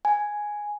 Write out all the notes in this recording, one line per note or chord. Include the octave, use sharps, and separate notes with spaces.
G#5